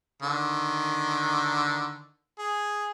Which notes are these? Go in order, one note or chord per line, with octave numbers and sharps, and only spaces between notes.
D3 D#3
G#4